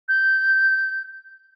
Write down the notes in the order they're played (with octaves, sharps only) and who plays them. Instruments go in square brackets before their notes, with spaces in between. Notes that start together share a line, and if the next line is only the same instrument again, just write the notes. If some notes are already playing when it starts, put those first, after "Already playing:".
[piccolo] G6